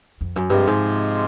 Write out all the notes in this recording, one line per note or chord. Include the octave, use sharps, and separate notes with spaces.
F2
F#2
G2 C3 F3 G#3
G#2